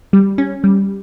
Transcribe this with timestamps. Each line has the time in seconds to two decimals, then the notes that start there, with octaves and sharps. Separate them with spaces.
0.13 G3
0.38 C#4
0.64 G3